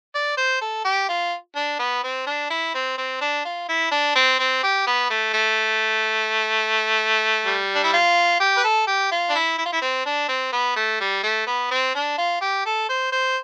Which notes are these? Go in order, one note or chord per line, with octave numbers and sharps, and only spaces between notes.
D5
C5
A4
G4
F4
D4
B3
C4
D4
E4
C4
C4
D4
F4
E4
D4
C4
C4
G4
B3
A3
A3
G3
D4
E4
F4
G4
B4
A4
G4
F4
D4
E4
E4
F4
E4
C4
D4
C4
B3
A3
G3
A3
B3
C4
D4
F4
G4
A4
C5
C5